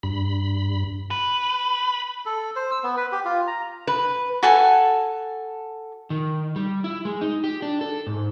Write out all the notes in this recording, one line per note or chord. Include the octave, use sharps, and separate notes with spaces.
G2 B5
B4
A4
C5
E6
B3
B4
G4
F4
A#5
B4
F#4 A4 G#5 A5
D#3
G3
E4
G#3
D#4
G4
D4
A4
G#2